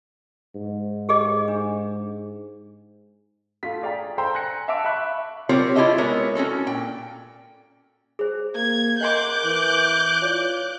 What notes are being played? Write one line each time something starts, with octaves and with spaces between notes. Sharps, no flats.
G#2
G4 G#4 D#5
D4
A3 F4 B6
G#4 D5 F5 G5 A#5
A4 C5 G5 A#5 C6 E6
G#5 F#6 A#6 C#7
E5 F5 A5 D6 E6 D7
E5 B5 C#6 F#6
G3 C4 F4 G4 A#4 C#5
E4 F4 G4 G#4 D#5 E5
G#3 B3 E4 A#4 C#5
C#4 F4 F#4 A4
A#2 G5
G#4 C5
A#3 G#6
A#4 D#5 F#5 C6 D6 F#6 G6
E3
F4 C#5 D5